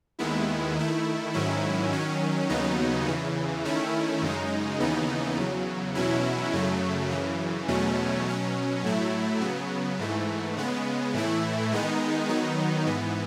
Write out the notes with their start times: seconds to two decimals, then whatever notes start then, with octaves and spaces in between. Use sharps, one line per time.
0.19 D#2 D#3 G#3 B3 E4
0.77 D#3 A3 E4
1.34 G#2 D#3 F#3 C#4 E4
1.92 D#3 F#3 C#4
2.49 D#2 C#3 F#3 B3 D#4
3.06 E2 C#3 E3
3.65 D#3 A3 C#4 E4
4.22 F#2 C#3 G#3 D#4
4.80 D#2 C#3 E3 B3 D#4
5.37 E2 C#3 F#3
5.95 E2 B2 F#3 C#4 E4
6.53 F#2 C#3 F#3 A3
7.10 F#2 C#3 E3
7.68 E2 B2 F#3 A3 C#4
8.26 B2 F#3 C#4
8.84 A2 F#3 A3 E4
9.41 C#3 F#3 B3
9.99 G#2 E3 A3
10.57 C#3 G#3 B3
11.14 A2 E3 A3 E4
11.72 D#3 G#3 B3 D#4
12.29 D#3 F#3 B3 D#4
12.86 G#2 E3 B3